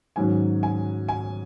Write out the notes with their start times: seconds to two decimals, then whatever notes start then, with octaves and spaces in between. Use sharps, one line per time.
0.16 G#2 D#3 F#3 C#4 G#5
0.63 G#5
1.08 G#5